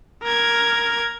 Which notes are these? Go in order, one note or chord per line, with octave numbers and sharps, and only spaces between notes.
A#4 G#6